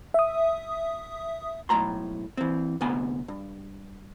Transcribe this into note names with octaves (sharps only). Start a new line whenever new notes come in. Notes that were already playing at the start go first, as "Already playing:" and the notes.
E5 D#6
B1 F#2 A2 A#5 C6
E3 C4
D2 C3 B3 G#5
G2